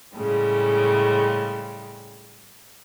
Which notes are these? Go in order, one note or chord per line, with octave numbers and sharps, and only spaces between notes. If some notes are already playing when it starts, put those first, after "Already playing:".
A2 C#3 G3 G#3